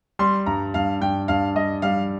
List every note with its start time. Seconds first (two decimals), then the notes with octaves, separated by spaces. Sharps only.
0.19 G3 C6
0.46 G2 A#5
0.74 G2 F5
1.01 G2 G5
1.28 G2 F5
1.55 G3 D#5
1.82 G3 F5